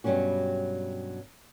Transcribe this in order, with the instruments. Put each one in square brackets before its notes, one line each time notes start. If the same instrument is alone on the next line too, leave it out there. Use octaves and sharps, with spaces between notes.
[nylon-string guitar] G2 B2 F#3 G3 C#4 F#4